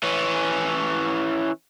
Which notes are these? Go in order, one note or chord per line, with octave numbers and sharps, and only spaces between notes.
E3 C#4